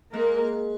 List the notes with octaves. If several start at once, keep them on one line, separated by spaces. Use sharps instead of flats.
G#3 A#3 A#4